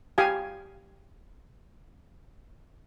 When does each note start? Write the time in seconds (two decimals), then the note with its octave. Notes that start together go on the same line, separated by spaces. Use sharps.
0.18 G4 F5 G#5